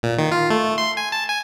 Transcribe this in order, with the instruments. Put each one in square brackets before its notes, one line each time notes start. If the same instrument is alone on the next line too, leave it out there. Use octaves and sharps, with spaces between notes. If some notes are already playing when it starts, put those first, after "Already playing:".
[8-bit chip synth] A#2
D#3
F4
A3
C6
G#5
A5
G#5